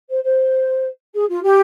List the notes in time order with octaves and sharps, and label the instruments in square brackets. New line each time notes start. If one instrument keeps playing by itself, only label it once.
[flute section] C5
C5
G#4
F4
G4